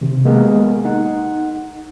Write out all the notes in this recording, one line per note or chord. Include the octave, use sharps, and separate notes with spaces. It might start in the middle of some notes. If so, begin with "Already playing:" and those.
C3 D#3
G#3 A#3 B3 G4 G#4 A#4
D#4 F#5